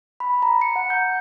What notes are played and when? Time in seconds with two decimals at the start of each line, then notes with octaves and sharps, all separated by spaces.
0.20 B5
0.42 A#5
0.61 C#7
0.76 F#5
0.90 G6